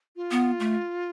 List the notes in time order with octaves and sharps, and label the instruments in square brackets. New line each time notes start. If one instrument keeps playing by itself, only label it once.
[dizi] F4
[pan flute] B3
A3